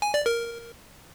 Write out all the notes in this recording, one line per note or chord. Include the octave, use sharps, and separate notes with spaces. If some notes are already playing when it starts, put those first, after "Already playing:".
G#5
D5
A#4